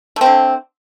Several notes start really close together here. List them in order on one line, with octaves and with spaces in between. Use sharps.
A3 C4 D3